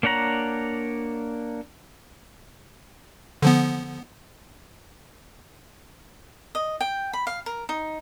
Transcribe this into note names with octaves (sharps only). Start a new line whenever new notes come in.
A#3 D4 C#5 F#5 A#5
D3 F3 B3
D#5
G5
B5
F5
A#4
D#4